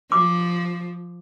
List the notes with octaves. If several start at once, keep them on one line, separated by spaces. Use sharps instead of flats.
F3 D6